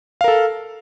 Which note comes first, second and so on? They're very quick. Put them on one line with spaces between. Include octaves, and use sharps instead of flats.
F5 A#4 A4